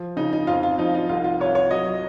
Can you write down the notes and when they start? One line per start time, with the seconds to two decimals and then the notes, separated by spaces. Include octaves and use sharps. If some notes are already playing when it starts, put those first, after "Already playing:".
Already playing: F3
0.16 C#3 D#4
0.33 D#4
0.47 F2 F4
0.63 F4
0.78 F3 D#4
0.95 D#4
1.09 C2 F4
1.24 F4
1.40 C2 C#5
1.55 C#5
1.71 F#3 D#5